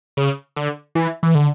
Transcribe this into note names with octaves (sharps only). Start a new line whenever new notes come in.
C#3
D3
E3
E3
D3